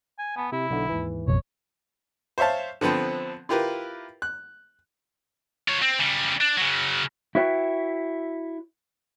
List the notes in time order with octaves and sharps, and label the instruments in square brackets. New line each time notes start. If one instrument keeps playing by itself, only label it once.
[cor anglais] G#5
[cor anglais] B3 [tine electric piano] G#5 A5
[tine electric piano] C3 [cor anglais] E4
[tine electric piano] B1 D3
D#2 G#2 E3
[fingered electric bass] A1 F2 B2 [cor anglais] C#5
[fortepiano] C5 C#5 E5 F5 A5
D3 F3 B3 C4
E4 F4 G4 A#4 B4
F#6
[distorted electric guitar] F4 C#5
C4
C#3 G3
D4
C#3 F#3
[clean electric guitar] E4 F#4 B4 C#5 E5 G5